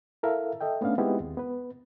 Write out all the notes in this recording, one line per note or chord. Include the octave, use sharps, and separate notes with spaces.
E4 A4 A#4 E5 F5
A4 D#5 E5 G5
A3 B3 C#4 D4 F5
G#3 B3 C4 D#4 E4 G4
D#2
B3 B4